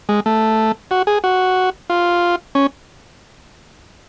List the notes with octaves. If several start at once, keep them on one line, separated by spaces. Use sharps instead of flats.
G#3
A3
F#4
G#4
F#4
F4
C#4